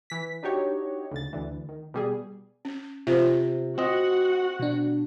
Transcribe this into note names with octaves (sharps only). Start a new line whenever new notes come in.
E3 B6
D4 D#4 F#4 G4 C#5
D2 C#3 A6
D2 D3 E3
D#3
B2 G3 G#4
C#4
C3 F4 C5
C4 F#4 D#5 F#5
B2 D4